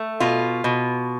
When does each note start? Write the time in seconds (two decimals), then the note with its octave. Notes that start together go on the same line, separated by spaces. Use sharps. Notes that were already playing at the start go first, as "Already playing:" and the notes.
Already playing: A3
0.20 B2 F4
0.64 B2